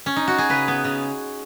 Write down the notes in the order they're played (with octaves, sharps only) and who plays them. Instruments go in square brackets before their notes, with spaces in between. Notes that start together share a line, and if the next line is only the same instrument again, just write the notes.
[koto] C#4
D#4
F#4
G#4
C#3 B4
B3
C#3